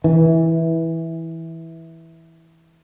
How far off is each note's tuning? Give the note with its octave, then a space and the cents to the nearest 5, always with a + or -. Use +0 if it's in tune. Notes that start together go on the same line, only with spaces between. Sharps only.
E3 -10